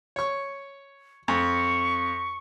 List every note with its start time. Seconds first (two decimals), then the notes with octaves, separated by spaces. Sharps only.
0.16 C#5 C#6
1.28 F2 C#6